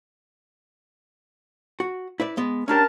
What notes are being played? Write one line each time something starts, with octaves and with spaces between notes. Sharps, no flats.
F#4
E4 B4 D5
G#3 B3
C#4 D4 G4 A#4 A5